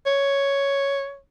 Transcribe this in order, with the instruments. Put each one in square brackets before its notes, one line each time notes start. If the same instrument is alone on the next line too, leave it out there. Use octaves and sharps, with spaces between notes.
[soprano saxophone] C#5